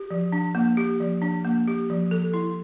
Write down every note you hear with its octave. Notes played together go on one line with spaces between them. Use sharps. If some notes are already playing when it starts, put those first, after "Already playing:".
Already playing: G4
F3
D4
A#3
G4
F3
D4
A#3
G4
F3
A4
E4